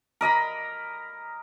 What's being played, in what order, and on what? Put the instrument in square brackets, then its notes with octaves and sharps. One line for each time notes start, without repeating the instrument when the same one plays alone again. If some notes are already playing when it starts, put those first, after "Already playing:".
[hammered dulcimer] A#4 D#5 A#5 B5